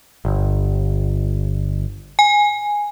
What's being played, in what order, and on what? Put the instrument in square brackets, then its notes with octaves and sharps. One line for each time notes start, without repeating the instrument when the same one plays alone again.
[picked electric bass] G1
[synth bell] G#5